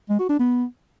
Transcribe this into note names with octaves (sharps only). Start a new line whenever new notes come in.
G#3
F#4
D4
B3